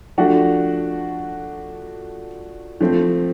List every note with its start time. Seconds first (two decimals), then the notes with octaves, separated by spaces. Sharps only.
0.18 F3 A3 D4 F#4
2.81 F3 A3 C4